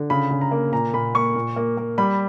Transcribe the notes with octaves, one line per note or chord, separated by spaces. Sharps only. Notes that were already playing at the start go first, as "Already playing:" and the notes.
Already playing: D3
C#3 B5
C#3
A#5
A#3
A#2 A#5
A#2 B5
A#3 C#6
A#2
A#3
A#3
G3 B5